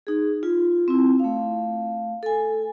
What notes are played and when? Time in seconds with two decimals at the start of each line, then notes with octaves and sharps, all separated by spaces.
0.07 D#4 G#4
0.43 F4
0.88 C4 E4
1.20 A3 F5
2.23 A4 G#5